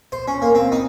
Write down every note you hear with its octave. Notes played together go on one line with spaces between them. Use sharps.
C5
C#4
A#3
C4
D#4